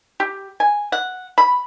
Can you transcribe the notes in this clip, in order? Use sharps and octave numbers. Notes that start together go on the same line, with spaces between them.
G4
G#5
F#5
B5